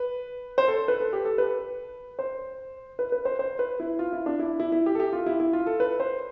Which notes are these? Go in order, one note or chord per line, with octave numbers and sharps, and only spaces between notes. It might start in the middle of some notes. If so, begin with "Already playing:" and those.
Already playing: B4
C5
A4
B4
A4
G4
A4
B4
C5
B4
B4
C5
C5
B4
E4
F4
E4
D4
E4
E4
E4
G4
A4
G4
F4
E4
E4
F4
A4
B4
C5